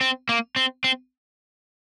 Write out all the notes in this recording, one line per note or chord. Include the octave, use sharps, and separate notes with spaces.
C4
A#3
C4
C4